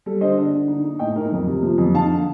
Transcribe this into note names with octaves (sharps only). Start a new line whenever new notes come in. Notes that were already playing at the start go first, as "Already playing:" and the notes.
G3 A4
D3 C5 D#5
D4
D3
D#4
D#4
A2 D#5 G5
D#4 A#4
F2 A#4
C3
F3
F2
D#4 F5 A5
D3